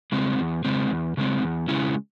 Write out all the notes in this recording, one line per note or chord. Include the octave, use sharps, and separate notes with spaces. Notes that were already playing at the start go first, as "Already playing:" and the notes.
C#3 G#3 C4
E2
C#3 G#3 C4
E2
C#3 G#3 C4
E2
C#3 G#3 C#4 E4